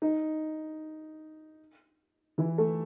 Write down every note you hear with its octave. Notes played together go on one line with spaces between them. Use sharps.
D#4
E3 E4
A3 A4